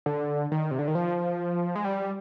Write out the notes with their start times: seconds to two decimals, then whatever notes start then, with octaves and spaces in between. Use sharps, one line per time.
0.06 D3
0.51 D#3
0.71 C3
0.79 D3
0.88 D#3
0.95 F3
1.76 G#3
1.84 G3